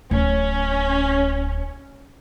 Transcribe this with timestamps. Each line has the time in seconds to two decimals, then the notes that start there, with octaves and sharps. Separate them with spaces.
0.11 D1 C#4